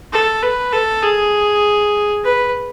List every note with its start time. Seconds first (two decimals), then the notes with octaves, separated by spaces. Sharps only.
0.12 A4
0.43 B4
0.73 A4
1.02 G#4
2.24 B4